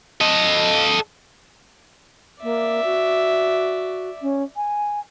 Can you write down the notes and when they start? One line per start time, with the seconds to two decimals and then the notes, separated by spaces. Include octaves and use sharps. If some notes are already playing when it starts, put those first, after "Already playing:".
0.21 A4 D#5
2.43 A#3 D5 E5
2.84 F#4
4.21 C#4
4.56 G#5